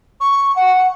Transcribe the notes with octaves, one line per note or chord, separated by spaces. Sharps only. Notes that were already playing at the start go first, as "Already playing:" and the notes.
C#6
F#5